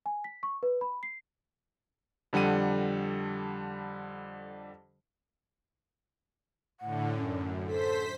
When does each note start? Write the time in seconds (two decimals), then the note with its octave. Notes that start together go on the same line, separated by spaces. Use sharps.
0.06 G#5
0.24 B6
0.43 C#6
0.63 B4
0.81 B5
1.03 C7
2.33 F2 D3 G3 F#5 D#7
6.80 A2 D3 F#5
7.16 F#2 C#4
7.67 A4 C5 B6